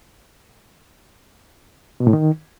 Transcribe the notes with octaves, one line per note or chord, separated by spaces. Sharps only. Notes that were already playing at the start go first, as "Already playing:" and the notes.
B2
A2
D#3